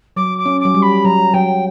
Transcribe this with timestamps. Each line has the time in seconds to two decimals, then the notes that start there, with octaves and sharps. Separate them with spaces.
0.16 F#3 D6
0.38 D6
0.46 C#4
0.61 F#3 D6
0.74 G3
0.82 B5
1.05 F#3 A#5
1.34 F#3 G5